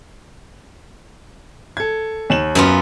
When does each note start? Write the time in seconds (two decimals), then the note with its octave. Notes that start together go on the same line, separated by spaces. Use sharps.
1.77 A4 G#6
2.30 D#2 E7 F#7
2.55 F#2 B3 F4